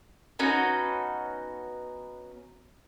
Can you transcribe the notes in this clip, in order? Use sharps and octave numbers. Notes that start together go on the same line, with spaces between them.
B3 C#4 D#4 F#4